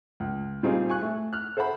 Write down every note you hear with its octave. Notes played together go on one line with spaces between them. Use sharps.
C#2
A#2 G3 C4 D#4 F4 G#4
G#5 C#6 F#6
A3
F6 F#6
A4 C5 E5 F#5 B5